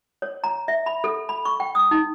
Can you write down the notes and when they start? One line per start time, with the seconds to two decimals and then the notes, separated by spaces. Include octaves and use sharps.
0.22 C#5
0.44 A#5
0.68 E5
0.86 B5
1.04 A4
1.29 B5
1.45 C#6
1.60 G5
1.75 D#6
1.91 D#4